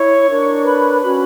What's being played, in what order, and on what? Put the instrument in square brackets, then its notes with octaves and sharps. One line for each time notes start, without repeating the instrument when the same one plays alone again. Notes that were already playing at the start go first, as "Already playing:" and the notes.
Already playing: [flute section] E4 C#5 C#6
D4 A#4 C#5
B4 B5
C#4 F#4 B4